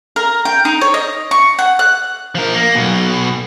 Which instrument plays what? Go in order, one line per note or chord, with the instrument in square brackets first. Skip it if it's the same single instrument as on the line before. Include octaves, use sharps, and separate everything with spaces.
[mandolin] A#4
G5
D#4
C#5
D#5
C#6
F#5
F#6
[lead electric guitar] F3 A#4
A#3
B1 B2